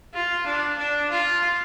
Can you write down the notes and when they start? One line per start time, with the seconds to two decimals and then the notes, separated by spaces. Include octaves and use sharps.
0.14 F4
0.46 D4
0.78 D4
1.10 F4